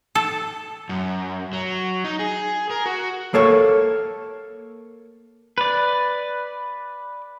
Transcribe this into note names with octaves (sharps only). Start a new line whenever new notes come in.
A4
F#2
F#3
D#4
G#4
A#4
F#4
A#3 A4 C#5
B4 D5